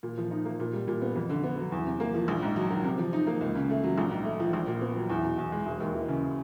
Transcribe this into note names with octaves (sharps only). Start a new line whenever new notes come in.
A#2
F3
D#4
A#3
A#2
G3
A#2
B3
F2
D3
B3
F#3
E2
C3
A#3
F3
A#1
G#2
F#3
D#3
C3
F3
D#4
A#3
C#2
C#3
A3
F#3
A#1
G#2
A3
F3
A#1
A#2
B3
F#3
E2
B2
E2
G#3
E1
D#2
E3
C#3